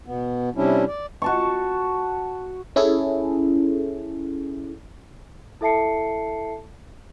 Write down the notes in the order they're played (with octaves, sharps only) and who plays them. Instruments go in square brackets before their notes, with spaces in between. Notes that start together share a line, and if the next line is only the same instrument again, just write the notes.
[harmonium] B2 B3
C3 G3 C#4 D4 E4
D5
[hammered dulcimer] F#4 A5 C#6
[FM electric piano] C#4 E4 G#4 A4
[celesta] E4 A4 E5 A5 C7 C#7